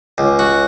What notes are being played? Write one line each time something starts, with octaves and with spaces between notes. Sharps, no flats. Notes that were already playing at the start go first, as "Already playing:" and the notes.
C#2
F#4